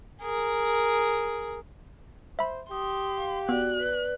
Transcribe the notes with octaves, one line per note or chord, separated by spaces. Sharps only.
G#4 A#4
C5 E5 B5
G4 C6 D#6
F5
B3 F#4 D5 F#6
B4 D5